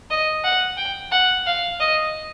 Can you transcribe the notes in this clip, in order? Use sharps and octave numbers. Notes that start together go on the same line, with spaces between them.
D#5
F#5
G5
F#5
F5
D#5